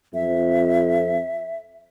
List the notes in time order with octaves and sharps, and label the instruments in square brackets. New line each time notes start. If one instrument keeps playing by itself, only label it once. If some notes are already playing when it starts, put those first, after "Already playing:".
[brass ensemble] F2 [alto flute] E5